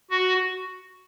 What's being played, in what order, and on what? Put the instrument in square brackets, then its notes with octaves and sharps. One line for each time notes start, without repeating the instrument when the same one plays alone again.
[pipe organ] F#4